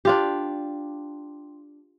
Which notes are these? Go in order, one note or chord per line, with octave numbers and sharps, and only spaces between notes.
D4 F4 G4